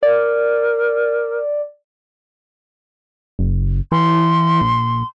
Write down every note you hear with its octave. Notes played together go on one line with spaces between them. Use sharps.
A#4 D5
F#1
E3 C6
A#1